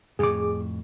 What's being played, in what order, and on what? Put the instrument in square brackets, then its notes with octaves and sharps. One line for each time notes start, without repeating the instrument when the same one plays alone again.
[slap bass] F2 A2 [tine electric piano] G#4 D6